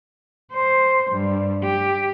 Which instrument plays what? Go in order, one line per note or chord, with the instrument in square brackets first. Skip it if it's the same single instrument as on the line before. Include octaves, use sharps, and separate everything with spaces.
[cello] C5
G2
G4